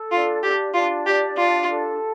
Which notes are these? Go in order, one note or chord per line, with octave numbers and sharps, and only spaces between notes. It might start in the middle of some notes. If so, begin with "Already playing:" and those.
Already playing: A4
D4 F4
D4 G4
D4 F4
G4 D5
D4 F4
A4